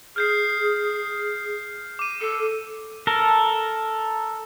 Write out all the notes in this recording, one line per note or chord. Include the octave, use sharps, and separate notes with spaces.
G#4 F6 G6 C7
D6 D#7
A4
A4 A#4